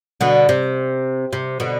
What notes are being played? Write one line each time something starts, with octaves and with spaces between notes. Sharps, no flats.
B2 D3
C3
C3
B2 D3